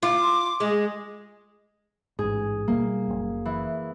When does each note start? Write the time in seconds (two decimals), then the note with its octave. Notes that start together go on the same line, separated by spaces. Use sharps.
0.03 F4 D6
0.21 C6
0.60 G#3 D#5
2.19 A1 G#2 G#4
2.68 D2 B2 G3 A#3
3.10 F#1
3.45 E3